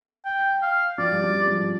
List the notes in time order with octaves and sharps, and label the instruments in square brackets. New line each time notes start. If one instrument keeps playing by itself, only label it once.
[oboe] G5
F5
[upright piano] F3 [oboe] D5
[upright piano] G3
F3
G3
F3